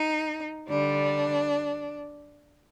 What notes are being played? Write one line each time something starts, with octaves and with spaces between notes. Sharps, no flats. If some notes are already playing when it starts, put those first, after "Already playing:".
Already playing: D#4
D3 G3 D4